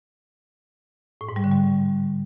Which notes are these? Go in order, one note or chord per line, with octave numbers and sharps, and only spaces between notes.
A2
G#2
G3
D3
G3